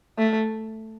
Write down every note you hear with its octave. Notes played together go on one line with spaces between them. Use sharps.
A3